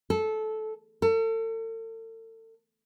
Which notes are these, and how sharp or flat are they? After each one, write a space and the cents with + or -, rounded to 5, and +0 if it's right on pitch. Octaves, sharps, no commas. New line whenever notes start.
A4 -15
A4 +40